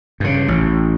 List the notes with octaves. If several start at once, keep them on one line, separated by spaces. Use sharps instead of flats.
G2 C#3
A1